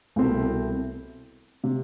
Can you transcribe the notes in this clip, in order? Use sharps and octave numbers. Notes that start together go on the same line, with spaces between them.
C2 B2 A3 C4 E4
C3